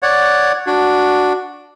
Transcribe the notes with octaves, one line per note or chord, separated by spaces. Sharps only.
C#5 D5 F#5
D4 F#4